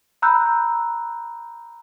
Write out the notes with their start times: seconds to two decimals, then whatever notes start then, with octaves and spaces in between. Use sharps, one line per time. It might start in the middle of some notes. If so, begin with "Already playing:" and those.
0.22 A#5 B5 E6 F#6 G6